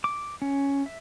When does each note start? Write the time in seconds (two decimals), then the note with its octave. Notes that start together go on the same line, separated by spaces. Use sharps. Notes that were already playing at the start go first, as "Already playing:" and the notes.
0.04 D6
0.42 C#4
0.86 E5